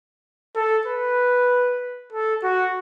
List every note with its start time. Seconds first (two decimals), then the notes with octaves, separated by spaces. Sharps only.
0.56 A4
0.87 B4
2.13 A4
2.44 F#4